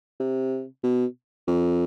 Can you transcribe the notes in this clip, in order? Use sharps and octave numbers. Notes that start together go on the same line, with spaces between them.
C3
B2
F2